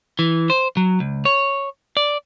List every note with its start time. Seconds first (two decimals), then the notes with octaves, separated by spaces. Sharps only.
0.19 E3
0.50 C5
0.77 F#3
1.00 C#2
1.25 C#5
1.97 D5